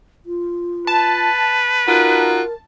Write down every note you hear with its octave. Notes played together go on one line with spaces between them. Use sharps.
F4
B4 A5
D#4 F4 F#4 A#4